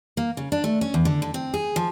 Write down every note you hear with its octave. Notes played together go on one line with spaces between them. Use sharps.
A#3
C#3
D4
A3
C#4
E2
D3
D3
C4
G#4
F3